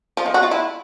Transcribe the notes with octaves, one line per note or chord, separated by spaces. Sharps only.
F3
D#3
F#4
F4
E4